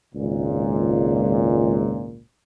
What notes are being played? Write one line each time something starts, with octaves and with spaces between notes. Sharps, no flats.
G#1 C#2 A#2